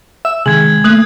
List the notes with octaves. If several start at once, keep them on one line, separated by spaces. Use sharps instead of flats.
E5 E6
C3 D#3 G#3 G#6 F#7
A3 A#3 D#6 F#6 F#7